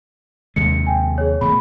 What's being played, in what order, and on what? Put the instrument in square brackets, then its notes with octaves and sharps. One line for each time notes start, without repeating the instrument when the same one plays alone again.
[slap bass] D#2 C3 G#3 [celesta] C#7
[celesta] G5 G#5
G#4 C#5
[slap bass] B2 D#3 A3 [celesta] B5